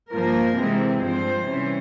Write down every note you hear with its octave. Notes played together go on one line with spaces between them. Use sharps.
G2 F3 A#3 A#4
C3 E3 G#3 C4
G2 F3 C4 C5
C3 E3 G3 C#4